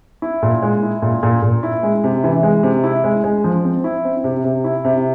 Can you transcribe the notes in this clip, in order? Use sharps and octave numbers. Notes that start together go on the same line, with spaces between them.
E4
A#2
G#3
E4
A#2
A#2
A#2
E4
G#3
C3
E3
G#3
C3
E4
G#3
G#3
F3
C4
E4
C4
C3
C3
E4
C3